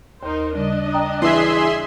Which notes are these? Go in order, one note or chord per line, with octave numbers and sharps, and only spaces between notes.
D#2 D#4 A#4 C5
C#3 G3 D4 D#5
G5 A#5 D#6
E3 G#4 E5 C6